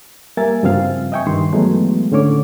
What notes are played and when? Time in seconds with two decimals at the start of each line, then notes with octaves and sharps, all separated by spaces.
0.37 G3 A#3 A#4 E5 G#5 A6
0.63 G2 C#3 F3 C4 F4 F5
1.12 D#5 E5 G5 G#5 C#6
1.27 G2 D#3 C6
1.53 E3 F#3 G#3 A3 B3
2.12 A2 D3 C#4 C#5 D6